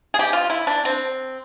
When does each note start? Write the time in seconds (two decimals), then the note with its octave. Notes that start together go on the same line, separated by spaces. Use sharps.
0.14 G#4
0.19 G4
0.33 F4
0.50 E4
0.67 D4
0.85 C4